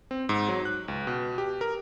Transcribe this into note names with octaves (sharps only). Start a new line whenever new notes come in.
C4
G#2
F#3
F#6
C#2
B2
G4
A#4